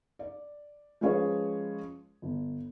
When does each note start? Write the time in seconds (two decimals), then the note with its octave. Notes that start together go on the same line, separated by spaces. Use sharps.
0.19 D5
1.01 F3 G#3 C#4 G#4 B4 C#5
2.22 G1